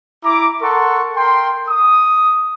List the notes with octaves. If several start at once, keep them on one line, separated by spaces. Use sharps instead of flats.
E4 A#5 D6
A4 A#4 F#5 C6 C#6
A#4 G5 C6
D#6